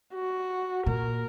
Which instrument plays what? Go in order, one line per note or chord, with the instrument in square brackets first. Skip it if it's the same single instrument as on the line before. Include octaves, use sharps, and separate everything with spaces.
[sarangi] F#4
[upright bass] A#2 [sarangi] A#4